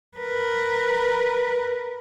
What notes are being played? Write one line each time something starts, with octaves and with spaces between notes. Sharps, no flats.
A#4 B4